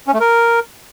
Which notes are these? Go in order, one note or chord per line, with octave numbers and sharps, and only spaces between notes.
C#4
A3
A#4